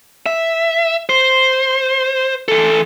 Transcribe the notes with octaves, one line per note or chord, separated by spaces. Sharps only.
E5
C5
E3 A4